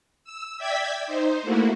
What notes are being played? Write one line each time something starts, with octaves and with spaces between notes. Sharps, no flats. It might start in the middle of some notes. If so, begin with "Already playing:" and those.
E6
D5 E5 G5 G#6 B6
D#4 C5
A3 A#3 E4 F#4